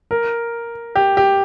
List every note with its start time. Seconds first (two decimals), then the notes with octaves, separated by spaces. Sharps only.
0.11 A#4
0.95 G4
1.17 G4